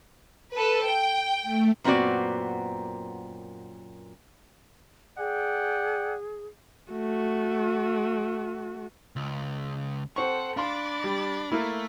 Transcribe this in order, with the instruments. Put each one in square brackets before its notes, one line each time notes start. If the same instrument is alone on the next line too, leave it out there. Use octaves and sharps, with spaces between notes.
[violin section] A4 B4
G5
[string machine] A3
[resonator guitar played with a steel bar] F#2 A#2 B3 C4 F#4 D5
[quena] G#4 [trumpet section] D5 F#5 G5
[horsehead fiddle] A3 F#4
[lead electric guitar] C#2
[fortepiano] C4 C#6 [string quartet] A4 C5 F#5
[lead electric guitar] D4 [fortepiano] F5 C6 [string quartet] B5 D6 A6
[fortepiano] G3
[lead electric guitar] A3 [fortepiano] A#3 E4